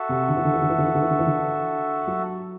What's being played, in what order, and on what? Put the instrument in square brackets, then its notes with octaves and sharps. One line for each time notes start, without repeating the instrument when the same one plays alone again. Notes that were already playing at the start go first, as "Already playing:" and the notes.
Already playing: [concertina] F#4 A4 E5
[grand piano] C3
D3
E3
D3
E3
D3
E3
D3
E3
D3
E3
D3
E3
D3
F#3